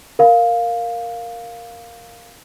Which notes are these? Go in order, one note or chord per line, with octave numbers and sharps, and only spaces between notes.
A#4 F5